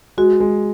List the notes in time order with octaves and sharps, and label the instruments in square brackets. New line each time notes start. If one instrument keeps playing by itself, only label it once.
[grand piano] G#3 [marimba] F#4
[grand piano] G#3